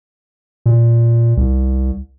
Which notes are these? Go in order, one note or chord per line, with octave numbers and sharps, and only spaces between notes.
A#2
C2